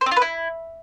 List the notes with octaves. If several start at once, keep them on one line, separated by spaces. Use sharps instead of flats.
C5
C4
F4
B4
E4